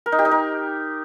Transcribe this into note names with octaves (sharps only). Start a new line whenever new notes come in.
A#4
D#4
G4
D#4
A#4